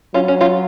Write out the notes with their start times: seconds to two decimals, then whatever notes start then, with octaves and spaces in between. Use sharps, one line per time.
0.14 F#3 C#4 F4
0.28 C#4
0.40 C#4 F4